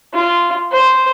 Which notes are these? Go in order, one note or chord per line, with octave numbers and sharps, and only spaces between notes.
F4
C5